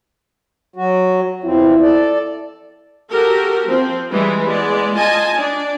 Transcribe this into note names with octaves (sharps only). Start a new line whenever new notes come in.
F#3 F#4
E2 F3 C4 E4
A4 D5
F#4 G4 A4 A#4
F3 C4
E3 G3 G#3 B4
G#3 B3 D5
F4 D#5 G#5 A5
D4 D5